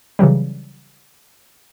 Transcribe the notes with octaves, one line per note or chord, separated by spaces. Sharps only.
C#3 E3 F#3 G3